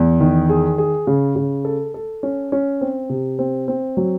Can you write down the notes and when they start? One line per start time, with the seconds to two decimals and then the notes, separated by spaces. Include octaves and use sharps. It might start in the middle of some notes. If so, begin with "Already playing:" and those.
Already playing: E2
0.20 D#3
0.49 G#4
0.78 G#4
1.07 C#3
1.36 C#3
1.65 A4
1.94 A4
2.23 C#4
2.52 C#4
2.81 C4
3.10 C3
3.39 C4
3.68 C4
3.97 F#3